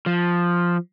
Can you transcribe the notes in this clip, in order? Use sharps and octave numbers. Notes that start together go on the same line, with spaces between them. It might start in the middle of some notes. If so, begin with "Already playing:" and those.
F3